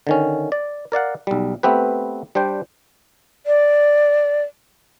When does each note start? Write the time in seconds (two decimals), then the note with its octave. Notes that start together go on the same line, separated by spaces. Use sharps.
0.07 D3 D#3 C#4
0.52 D5
0.92 A#4 D5 F5 F#5
1.27 B1 G3
1.63 A3 B3 C4 G4 B4
2.35 G3 D4 C5 G5
3.46 D5